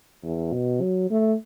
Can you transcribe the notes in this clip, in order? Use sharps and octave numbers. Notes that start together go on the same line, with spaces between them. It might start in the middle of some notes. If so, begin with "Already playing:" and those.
E2
B2
F#3
A3